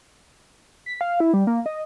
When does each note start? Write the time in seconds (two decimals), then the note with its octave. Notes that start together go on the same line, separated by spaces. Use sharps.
0.86 B6
1.01 F5
1.20 E4
1.34 G3
1.47 A#3
1.66 D#5